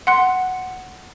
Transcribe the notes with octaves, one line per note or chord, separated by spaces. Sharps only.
F#5 C6 F#6 C#7